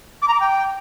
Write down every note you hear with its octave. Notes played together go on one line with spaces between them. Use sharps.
D6
A#5
D6
G5